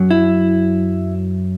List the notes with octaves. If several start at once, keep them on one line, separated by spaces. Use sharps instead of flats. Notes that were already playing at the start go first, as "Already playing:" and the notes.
Already playing: F#2 F#3
E4